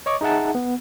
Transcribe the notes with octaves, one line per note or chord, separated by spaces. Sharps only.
C#5 D#5 C#6 D6
D#4 G#4 E5 F#5 A5
B3